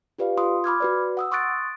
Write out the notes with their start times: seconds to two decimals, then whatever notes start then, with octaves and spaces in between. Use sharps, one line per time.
0.18 F4 G4 B4 D5 F5
0.37 F4 C6 D#6
0.64 B5 D6 F6 G#6
0.80 F#4 B4 D5
1.17 F#5 D#6 E6
1.31 C6 C#6 D#6 F#6 A6 D7